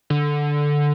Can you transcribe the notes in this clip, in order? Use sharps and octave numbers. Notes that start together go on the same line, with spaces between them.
D3